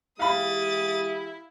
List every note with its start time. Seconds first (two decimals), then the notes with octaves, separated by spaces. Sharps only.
0.19 E3 G#3 E4 G4 F5 B5 D#6 A6